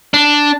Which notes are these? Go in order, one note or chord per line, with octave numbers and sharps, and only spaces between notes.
D4